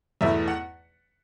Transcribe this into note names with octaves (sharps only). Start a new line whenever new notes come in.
E2 B2 A3 E4 E5
F#5